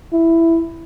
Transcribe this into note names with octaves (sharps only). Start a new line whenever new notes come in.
E4